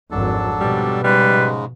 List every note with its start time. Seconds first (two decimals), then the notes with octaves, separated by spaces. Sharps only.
0.11 G#1 F2 G#2 F#3 D4 A4
0.60 B2 F3 G3
1.04 G#2 C#3 G3 G#3 B4